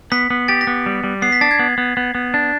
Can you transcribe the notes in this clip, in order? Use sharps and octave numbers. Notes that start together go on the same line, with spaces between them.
B3 B6
B3
G4 A6
A#6
B3
G3
G3
B3 C7
B6
D4 A6
G#6
B3
B3
B3
B3
D4